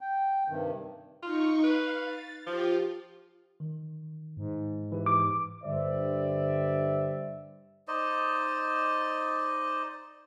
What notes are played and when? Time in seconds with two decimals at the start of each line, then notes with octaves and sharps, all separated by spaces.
0.01 G5
0.48 G2 C3 D#3
1.23 D#4 F4 C#6
1.64 B4 F5
2.04 A6
2.46 F3 F4 G4
3.60 D#3
4.37 G#2
4.92 E3 G4
5.06 D6
5.64 G2 D3 G3 C5 D5 E5
7.88 D#4 C5 D5 D#5